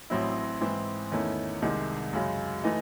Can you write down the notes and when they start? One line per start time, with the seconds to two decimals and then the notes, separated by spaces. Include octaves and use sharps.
0.10 A1 A2 F#3 C4 E4
0.61 G#2 E3 C4 E4
1.12 E2 D#3 A3 C#4 E4
1.62 C2 C3 D#3 G#3
2.13 F#2 C#3 G#3
2.64 E3 A3 D#4